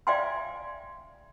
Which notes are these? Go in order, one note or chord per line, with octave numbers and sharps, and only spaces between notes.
D5 E5 F5 G5 G#5 C6